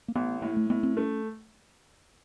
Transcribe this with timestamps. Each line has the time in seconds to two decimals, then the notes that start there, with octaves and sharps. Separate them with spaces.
0.08 A#3
0.15 A1 B3
0.42 A2 A3
0.57 A3
0.70 A2 B3
0.83 C4
0.97 A3 C#4